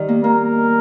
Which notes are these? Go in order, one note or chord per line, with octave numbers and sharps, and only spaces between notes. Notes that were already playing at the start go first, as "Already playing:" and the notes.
Already playing: D#3 G3
A#3
A#3 A#4